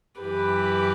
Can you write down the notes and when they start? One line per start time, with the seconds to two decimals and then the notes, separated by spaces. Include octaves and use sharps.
0.20 F#2 E3 G4 B4